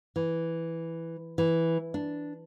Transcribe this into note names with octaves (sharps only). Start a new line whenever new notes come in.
E3
E3
D4